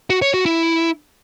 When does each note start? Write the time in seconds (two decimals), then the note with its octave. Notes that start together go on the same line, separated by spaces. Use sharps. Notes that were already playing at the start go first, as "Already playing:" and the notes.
0.10 F#4
0.22 C#5
0.34 F#4
0.46 E4